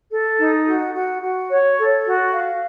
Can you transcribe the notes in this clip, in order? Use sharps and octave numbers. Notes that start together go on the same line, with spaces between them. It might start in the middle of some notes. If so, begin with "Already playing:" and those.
A4
D#4
F#4
F#4
F#4
C#5
A4
F#4
F5